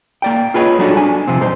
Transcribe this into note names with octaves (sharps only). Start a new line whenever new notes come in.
A#3 D5 G5
F4 G#4 B4 C#5 D#5
F#3 G3 D4 D#4 F#4 A4
D4 G#5
C3 F3 C4
B2 G3 C5